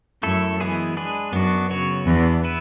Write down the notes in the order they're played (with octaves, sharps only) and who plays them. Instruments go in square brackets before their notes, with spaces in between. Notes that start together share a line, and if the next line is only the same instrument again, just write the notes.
[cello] F#2 [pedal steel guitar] A3 E4 A4
[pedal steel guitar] E3 G#3 B3 E4 G#4
G#3 D4 G#4 B4
[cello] F#2 [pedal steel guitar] B3 D4 F#4
[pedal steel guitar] C#3 F#3 B3 F#4 C#5
[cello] E2 [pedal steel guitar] E3 B3 D4
[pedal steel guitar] B3 E4 B4